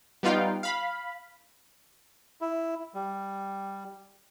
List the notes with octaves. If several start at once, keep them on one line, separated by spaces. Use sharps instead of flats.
G3 B3 D#4 F4 F5 G5
F5 B5
E4
G3